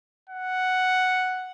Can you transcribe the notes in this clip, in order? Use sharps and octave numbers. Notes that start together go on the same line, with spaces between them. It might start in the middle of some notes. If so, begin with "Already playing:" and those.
F#5